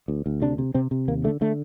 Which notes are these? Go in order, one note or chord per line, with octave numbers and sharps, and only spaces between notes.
D2
D2
C3 D4
C3
C3 C4
C3
D#2 A#3
D3 A3
D3 A3